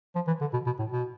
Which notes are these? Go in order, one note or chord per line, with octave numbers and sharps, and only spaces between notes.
F3
E3
D3
B2
B2
A2
B2